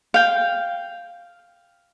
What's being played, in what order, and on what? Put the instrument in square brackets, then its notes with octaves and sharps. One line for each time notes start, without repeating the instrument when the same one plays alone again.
[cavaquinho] F5 G5